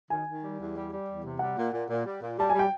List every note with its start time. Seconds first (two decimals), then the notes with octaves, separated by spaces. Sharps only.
0.10 D#3 G#5
0.26 D#3
0.42 G3
0.58 E2
0.75 G3
0.91 G3
1.07 E2
1.23 C3
1.39 G3 F#5
1.56 A#2
1.72 A#2
1.88 A#2
2.05 G3
2.21 A#2
2.38 G3 A5
2.50 G3 G#5
2.59 G5